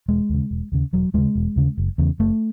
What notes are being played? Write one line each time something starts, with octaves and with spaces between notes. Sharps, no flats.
E1 G#3
D#2 C#3
E1
D#2 C#3
E1 F#3
D#2 C#3 G#3
E1
D#2 C#3
F#1
E2 C#3
F#1 A3